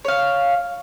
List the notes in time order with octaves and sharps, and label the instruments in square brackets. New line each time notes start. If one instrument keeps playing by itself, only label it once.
[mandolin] C#5 F5